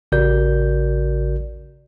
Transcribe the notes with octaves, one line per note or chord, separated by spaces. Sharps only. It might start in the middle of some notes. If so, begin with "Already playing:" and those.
A1 C#3 F#4 A#4 D5 G6